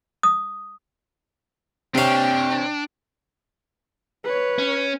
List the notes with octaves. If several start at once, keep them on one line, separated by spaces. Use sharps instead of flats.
D#6
C3 C4 D4 C#5 F5 G5
B4 C#5
C#4